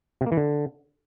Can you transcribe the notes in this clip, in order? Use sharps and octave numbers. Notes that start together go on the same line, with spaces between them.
C3
A#3
E3
D3